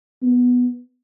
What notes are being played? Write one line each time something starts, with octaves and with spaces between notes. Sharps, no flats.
B3